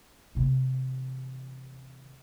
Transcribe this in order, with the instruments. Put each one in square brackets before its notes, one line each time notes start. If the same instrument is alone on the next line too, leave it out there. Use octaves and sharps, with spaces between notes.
[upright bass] C3 E3